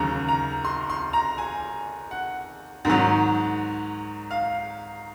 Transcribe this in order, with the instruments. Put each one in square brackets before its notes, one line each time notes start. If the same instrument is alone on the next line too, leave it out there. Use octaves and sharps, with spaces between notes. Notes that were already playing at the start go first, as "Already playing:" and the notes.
Already playing: [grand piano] D#2 C#3 F#3 A#5
A#5
C6
C6
A#5
G#5
F#5
G#2 D#3 F#3
F5